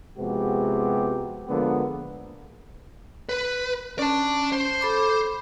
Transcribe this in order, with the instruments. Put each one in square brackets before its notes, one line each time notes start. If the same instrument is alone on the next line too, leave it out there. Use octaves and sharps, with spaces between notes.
[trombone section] C3 F3 G#3 B3 F#4 G4
D3 F3 G#3 A#3 B3
[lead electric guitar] B4
[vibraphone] C#4 [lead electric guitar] D5 A5
[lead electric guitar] C5
[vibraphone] A4 B5 D6